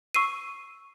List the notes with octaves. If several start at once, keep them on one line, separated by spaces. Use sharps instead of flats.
C#6 E6 C7 D#7